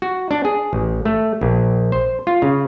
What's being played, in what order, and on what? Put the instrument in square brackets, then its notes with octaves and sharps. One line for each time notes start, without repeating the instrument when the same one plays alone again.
[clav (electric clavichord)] F#4
D4
G#4
A1
A3
A#1
C5
F4
C#3